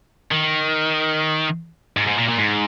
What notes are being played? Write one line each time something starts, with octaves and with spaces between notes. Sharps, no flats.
D#3
G#2
G#2
A#2
A#2
G#2